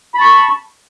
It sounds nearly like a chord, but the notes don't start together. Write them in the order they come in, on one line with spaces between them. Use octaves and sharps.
B5 A5 C#6